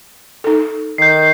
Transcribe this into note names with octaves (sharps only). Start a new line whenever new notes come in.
D#4 A4
D#3 G6 C7